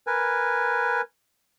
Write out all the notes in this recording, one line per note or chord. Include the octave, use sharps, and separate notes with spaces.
A#4 B4 G#5